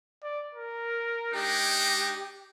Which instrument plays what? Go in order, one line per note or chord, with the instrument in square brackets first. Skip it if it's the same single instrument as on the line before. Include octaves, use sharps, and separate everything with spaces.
[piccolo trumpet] D5
A#4
[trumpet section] G#3 D4 D#4 [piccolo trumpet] G4